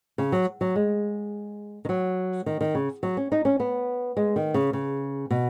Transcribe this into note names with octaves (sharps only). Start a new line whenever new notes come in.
C#3
F#3
F#3
G#3
D#3
F#3
D#3
D#3
C#3
F#3
C#4
D#4
C#4
B3
G#3
D#3
C#3
C#3
B2